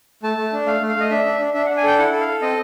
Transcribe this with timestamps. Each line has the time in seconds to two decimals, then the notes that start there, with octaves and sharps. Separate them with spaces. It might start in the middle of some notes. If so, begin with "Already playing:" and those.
0.23 A3 A5
0.37 A3
0.53 D4
0.66 A3 F5
0.82 A3
0.89 F5
0.96 A3 D#5
1.10 D4 E5
1.25 D4
1.41 D4
1.54 D4 E5
1.65 F#5
1.70 D4
1.77 G#5
1.84 A4 G5
1.99 E4 F#5
2.13 A4
2.20 F5
2.28 A4
2.42 C4 D#5